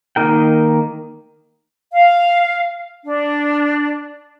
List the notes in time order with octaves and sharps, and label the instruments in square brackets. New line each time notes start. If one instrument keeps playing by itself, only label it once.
[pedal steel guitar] D#3 A#3 D#4 A#4 G5
[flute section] F5
D4